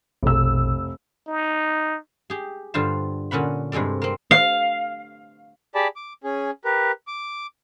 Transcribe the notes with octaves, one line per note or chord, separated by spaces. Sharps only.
F1 A#1 B2 E6
D#4
G4 G#4
G2 D3 F4 C5 A5
A#2 D3 C#4 F#5 B5
G2 C3 G#3 A4 D5
A#3 C4
F5
G4 G#4 D5 A5 B5
D6
C#4 G#4
G4 A#4 B4
D6